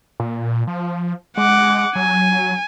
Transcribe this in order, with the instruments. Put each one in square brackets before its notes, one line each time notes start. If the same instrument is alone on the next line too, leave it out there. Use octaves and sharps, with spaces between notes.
[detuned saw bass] A#2
F3
[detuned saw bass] G#3 [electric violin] F#5 D6
[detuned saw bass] F#3 [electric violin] G#5